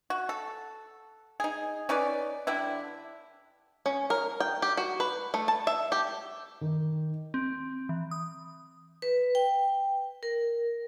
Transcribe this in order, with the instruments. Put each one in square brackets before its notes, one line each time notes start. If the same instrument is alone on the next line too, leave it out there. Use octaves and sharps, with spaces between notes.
[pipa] F#4
A4
D#4 G#4
C#4 D#4 B4 D5
D3 G3 D4 E4
[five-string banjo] C#4
A#4
G5
G4
F#4
B4
A3
A5
E5
G4
[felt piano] D#3
[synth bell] C4
E3
D#6
[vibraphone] B4
G5
A#4